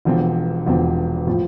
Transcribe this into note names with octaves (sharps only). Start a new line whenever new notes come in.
E1 E2 D3 F3 C4
E1 E2 D3 F3 C4
A2 F3 C4 F4